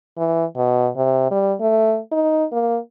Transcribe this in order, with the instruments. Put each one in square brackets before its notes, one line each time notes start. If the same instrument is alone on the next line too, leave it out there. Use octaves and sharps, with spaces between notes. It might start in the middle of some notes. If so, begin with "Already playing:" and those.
[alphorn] E3
B2
C3
G3
A3
D#4
A#3